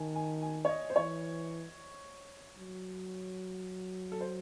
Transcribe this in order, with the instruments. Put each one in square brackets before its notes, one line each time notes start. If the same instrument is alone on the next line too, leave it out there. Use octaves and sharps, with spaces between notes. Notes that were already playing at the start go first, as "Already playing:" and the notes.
Already playing: [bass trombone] D#3 [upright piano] G#5 A5
[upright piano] G#5
G#5
C#5
D#5
C5
[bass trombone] E3 [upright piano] C#5
[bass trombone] F#3
[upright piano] A4
C5